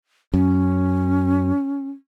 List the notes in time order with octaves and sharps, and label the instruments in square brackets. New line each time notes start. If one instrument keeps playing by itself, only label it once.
[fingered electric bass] F#2 [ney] C#4